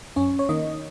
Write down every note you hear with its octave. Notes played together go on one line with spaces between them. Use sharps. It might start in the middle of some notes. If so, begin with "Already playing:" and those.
F#2 C#4 C#5
C#5
D#3 A#3 D#4 D#5